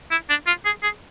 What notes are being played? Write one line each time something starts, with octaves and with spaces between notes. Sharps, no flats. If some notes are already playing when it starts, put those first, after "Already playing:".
E4
D4
F4
G#4
G#4